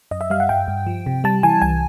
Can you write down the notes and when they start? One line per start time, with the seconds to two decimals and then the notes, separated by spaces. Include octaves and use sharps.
0.11 F#2 D#5
0.21 E5
0.30 G3 F5
0.40 F#5
0.49 G2 G5
0.68 G2
0.87 F3
1.06 C3
1.24 G3 A5
1.43 E3 G#5
1.62 C2 G#5